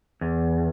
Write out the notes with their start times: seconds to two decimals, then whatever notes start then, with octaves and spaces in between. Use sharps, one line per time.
0.21 E2